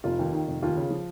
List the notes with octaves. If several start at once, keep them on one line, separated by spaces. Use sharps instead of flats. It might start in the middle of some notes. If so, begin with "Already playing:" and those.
F1 F4
D#2
D#3
F1
D#2 F4
C#3
F3